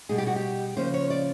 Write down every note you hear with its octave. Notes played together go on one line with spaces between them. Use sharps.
B2 G3 B3 D#4 G#4
G4
F#4
G4
C#3 F3 A#3 C#4 C5
C#5
D5